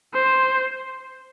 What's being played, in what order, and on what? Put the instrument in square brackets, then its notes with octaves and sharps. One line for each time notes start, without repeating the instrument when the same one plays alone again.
[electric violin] C5